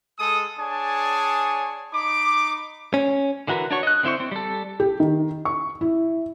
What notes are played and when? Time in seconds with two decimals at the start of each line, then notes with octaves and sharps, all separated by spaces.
0.19 G#3 G#4 A4 D#6
0.59 D4 G#4 C#5 G#5 A5
1.93 D#4 B5 D6
2.94 C#4
3.47 D3 E3 F#4 A#4 B4
3.71 D4 F#4 C#5 F#5 C#6
3.83 D#5 F#6
4.03 D3 C4 E4 C5 C#6
4.20 C4
4.32 G3 A4
4.80 G4
5.00 D#3
5.45 C#6
5.81 E4